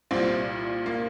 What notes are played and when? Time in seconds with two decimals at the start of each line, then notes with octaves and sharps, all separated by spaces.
0.11 C2 A#2 G3 C4
0.86 A#3